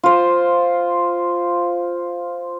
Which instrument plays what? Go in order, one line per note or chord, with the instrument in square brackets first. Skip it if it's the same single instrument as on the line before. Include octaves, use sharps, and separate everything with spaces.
[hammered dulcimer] F4 C5